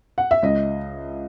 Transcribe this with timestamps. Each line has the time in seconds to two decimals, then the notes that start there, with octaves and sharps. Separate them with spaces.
0.18 F#5
0.31 E5
0.43 C#2 D#5